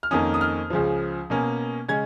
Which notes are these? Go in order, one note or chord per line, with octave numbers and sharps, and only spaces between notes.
F6
F2 D#3 A#3 C#4 D#6
D#6
F6
C#2 C#3 F3
B2 A#3 C#4
C#3 G#3 C#4 G#6